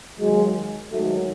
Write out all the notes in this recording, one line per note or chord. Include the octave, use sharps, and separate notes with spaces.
D#2 D#3 F#3 G#3
G#2 D#3 F#3 A3